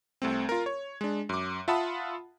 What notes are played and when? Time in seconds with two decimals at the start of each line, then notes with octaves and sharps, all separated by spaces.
0.22 C2 A3 C4
0.49 F4 A#4
0.66 C#5
1.01 G#3 D4
1.29 F#2 D6
1.68 F4 E5 F#5 A5 B5 D#6